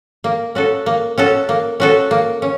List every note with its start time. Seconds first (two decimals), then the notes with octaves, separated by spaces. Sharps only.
0.24 A#3
0.55 C#4 F#4 A4
0.86 A#3
1.18 C#4 F#4 A4
1.49 A#3
1.80 C#4 F#4 A4
2.11 A#3
2.42 C#4